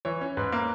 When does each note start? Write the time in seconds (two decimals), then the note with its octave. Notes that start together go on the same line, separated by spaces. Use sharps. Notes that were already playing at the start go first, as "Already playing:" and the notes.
0.05 E3 C#5
0.21 C#4
0.37 G#2 B4
0.52 A#3